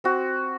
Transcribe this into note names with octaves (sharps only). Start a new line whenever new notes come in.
C4 F#4